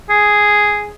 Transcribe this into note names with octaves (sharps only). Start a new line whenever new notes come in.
G#4